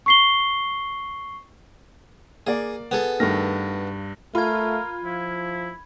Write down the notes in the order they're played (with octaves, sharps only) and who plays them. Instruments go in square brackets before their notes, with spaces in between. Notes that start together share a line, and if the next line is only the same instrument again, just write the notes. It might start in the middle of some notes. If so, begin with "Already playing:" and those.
[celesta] C#6 C7 G7
[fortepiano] A#3 D5 [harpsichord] G#4
[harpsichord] B3 G#4 A4
[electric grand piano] G2 A#6 [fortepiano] D#3 A3 F6
[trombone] A3 [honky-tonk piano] F4 [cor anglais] A#4 [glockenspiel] B5 G#6
[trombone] F3 [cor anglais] E4